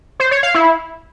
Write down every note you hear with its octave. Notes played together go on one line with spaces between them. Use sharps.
C5
C#5
F5
E4